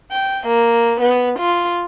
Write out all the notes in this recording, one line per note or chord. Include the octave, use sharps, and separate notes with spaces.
G5
A#3
B3
F4